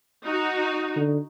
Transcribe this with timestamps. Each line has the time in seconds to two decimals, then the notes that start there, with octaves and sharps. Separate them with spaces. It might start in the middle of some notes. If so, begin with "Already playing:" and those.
0.24 D#4 F#4
0.96 D3